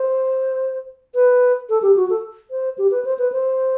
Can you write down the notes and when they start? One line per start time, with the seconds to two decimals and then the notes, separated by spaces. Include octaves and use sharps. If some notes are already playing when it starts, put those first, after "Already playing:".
Already playing: C5
1.14 B4
1.69 A4
1.82 G4
1.96 F#4
2.10 A4
2.50 C5
2.78 G4
2.91 B4
3.05 C5
3.18 B4
3.32 C5